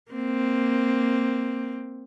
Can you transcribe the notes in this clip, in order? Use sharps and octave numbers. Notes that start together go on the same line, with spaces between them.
A#3 C4